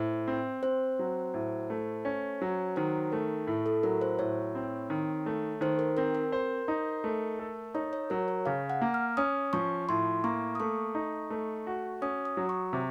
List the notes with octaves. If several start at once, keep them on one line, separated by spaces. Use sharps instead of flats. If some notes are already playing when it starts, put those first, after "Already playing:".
Already playing: A2 C5
C4
C4 C5
F#3
A2
A3
C#4
F#3
D#3 C5
A3 A#4
A2
A4
F#3 A#4
C5
A2 C#5
C4
D#3
A3
D#3 C5
A#4
C4 A#4
A#4
C5
D#4
A3
A4
D#4 C#5
C#5
F#3 A#4
C#5
C#3 F5
F#5
A#3
F6
C#4 D#6
F3 C#6
A2 C6
A#3 C#6
D#6
A3 C#6
D#4
A3
F#4
C#4 D#6
D#6
F#3
C#6
C3